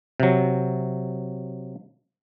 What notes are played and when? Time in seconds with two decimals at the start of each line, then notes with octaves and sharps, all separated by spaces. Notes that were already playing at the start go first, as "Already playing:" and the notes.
0.20 C3 F#3